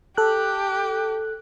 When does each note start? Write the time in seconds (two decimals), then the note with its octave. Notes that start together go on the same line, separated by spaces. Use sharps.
0.17 G4 A4 F#6